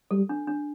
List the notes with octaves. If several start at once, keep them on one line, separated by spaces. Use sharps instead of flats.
G3 A4
D4
D4